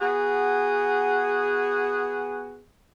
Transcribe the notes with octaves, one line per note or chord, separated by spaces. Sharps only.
B3 F#4 G#4